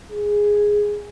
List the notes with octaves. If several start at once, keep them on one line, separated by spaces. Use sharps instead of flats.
G#4